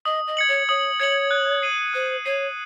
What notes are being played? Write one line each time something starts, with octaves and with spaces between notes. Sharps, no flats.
D#5 D#6
D#5
G#6 C#7 F#7
C#5
C#5 D#6
C#5 G#6 C#7 F#7
F#6
C7 D#7 F#7
C5 F#6
C#5 C7 D#7 F#7